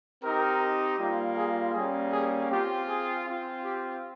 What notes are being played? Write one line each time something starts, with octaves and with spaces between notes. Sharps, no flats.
C4 D#4 G4 A#4
G3 A#3 F4
G#4
G3 A#3 C#4 G#4
G#4
C4 F4 G4
G#4
C4 F4
G4